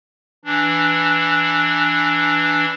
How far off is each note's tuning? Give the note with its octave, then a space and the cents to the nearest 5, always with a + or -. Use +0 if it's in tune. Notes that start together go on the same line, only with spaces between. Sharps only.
E3 +5 D4 +0